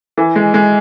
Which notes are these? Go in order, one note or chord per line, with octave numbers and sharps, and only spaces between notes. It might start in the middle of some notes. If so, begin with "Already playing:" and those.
E3
G#3
G#3